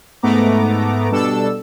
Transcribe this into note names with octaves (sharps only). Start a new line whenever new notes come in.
G#2 A3 B3 A#5 D6
B2 G3 D4 A4 E6